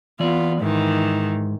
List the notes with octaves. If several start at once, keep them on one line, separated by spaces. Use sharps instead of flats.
E3 B3 F4 D5
G#2 D#3 E3